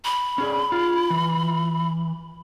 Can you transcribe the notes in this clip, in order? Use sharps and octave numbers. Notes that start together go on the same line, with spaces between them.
B5
C#4 G#4 D5
F4
E3